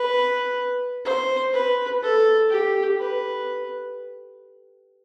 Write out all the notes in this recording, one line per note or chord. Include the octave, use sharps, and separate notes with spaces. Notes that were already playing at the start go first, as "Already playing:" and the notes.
Already playing: B4
C5
B4
A4
G4
B4